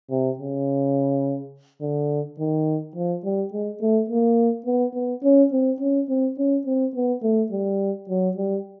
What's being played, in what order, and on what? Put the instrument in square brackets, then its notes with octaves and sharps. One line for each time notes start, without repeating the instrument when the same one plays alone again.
[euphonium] C3
C#3
D3
D#3
F3
G3
G#3
A3
A#3
B3
B3
C#4
C4
C#4
C4
C#4
C4
B3
A3
G3
F#3
G3